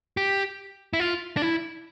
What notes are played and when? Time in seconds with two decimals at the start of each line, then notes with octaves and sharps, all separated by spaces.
0.17 G4
0.93 E4
1.00 F4
1.37 D4
1.42 E4